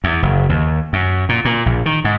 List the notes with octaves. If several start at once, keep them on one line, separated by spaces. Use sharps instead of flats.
E2
F#1
D#2
F#2
A#2
A#2
A#1
D#3
G#2